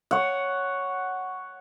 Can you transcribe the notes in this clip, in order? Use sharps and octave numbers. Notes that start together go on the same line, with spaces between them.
C#5 F#5